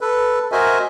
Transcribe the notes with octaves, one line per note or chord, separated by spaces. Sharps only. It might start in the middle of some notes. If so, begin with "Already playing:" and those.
A4 B4
F#4 A#4 C5 D#5 E5 G#5